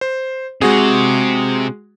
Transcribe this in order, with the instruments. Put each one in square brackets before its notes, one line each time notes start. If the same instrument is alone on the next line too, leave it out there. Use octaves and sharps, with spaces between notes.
[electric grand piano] C5
[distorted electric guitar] C3 [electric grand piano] G#3 F#4 G#4